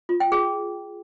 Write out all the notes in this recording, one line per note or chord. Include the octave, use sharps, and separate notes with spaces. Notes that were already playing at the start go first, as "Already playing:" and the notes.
F4
G5
G#4